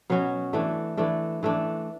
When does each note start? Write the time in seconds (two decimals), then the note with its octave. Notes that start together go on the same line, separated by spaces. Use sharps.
0.10 B2 F#3 C#4 F#4
0.53 E3 A3 D4
0.97 E3 A3 D4
1.43 E3 A3 D4